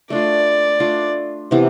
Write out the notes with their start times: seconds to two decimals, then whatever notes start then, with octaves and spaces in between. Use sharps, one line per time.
0.10 A3 D4 F4 D5
0.80 A3 D4 F4
1.51 C3 E3 B3